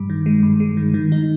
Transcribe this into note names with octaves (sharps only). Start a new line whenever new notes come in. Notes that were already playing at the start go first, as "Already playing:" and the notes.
Already playing: G2 G3
D#3
G#3
G2
G#3
D#3
D#3
D#4